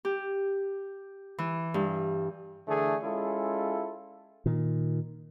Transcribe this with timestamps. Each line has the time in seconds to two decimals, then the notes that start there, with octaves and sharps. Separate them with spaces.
0.05 G4
1.38 E3
1.74 G2
2.67 D3 E3 A3 D4 G#4
3.02 G#3 C#4 E4 F4 A4
4.46 A#2 D#3